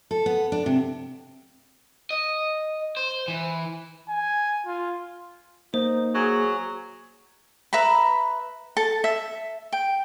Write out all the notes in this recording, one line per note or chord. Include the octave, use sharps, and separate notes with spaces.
A4
B3
D4
C3
D#5
C5
E3
G#5
F4
A#3 D#4 C5
F#3 G#4
B4 E5 A#5 B5
A4 A5
E5
G5